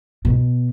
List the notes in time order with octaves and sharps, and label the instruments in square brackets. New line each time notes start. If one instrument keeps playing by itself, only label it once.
[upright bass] B2